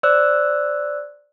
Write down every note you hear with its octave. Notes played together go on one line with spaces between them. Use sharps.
C5 D5 E6 F#6